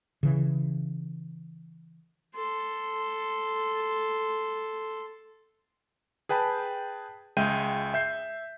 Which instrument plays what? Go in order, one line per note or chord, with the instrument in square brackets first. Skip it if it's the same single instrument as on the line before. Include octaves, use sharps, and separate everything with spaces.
[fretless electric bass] C#3 E3
[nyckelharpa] A4 C6
[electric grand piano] G#4 B4 G5 A5 B5
C#2 G#3 E5 G5 G6 D#7
E5 G6 C7